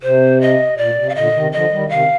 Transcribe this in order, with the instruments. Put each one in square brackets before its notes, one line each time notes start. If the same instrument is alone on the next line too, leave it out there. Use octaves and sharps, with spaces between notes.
[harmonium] C3 [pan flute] C5
[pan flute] D#5
[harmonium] A#2 [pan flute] D5
[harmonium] C3
[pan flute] F5
[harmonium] A#2 D3 [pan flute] D#5
[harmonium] C3 D#3
[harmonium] D3 F3 [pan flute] D#5
[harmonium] D#3 G3
[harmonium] C3 D#3 [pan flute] F5